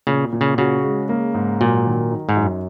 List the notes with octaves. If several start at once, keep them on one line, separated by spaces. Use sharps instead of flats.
A#2 C#3
A#2
C#3
C#3 F#4
G#3
A#3
G#2
A#2 F#3
D#3
D#4
G#2
F#2